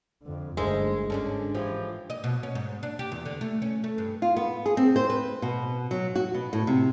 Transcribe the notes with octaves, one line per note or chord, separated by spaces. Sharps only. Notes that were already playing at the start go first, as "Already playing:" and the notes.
F2 D3
G1 D2 G2 G#3 D#4 A4 A#4 C5
G#2 D3 C#4 D4 A4
E3 F3 G4
D#5
B2
C#4
G#2
D4
G4
E2
D3
A3
C#4
A3
G2
F4
B3
G#4
C4
C5
B4
B2
F#3
F#4
B2
A2
C3